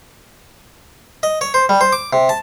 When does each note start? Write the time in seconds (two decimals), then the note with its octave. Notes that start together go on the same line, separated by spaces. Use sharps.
1.23 D#5
1.41 C#5
1.54 C5
1.69 G3
1.81 C5
1.92 D6
2.13 C3
2.29 A5